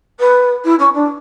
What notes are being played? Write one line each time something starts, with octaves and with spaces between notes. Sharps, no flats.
B4
E4
C#4
D4